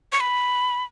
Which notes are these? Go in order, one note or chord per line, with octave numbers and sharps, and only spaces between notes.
C#6
B5